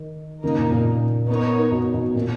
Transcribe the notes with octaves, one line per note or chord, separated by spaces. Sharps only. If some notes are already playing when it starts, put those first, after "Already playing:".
Already playing: D#3
C#3 A#3 D#4 A#4
A#2
A#2
B3 D#4 A#4 C#5
B2
B2
A#2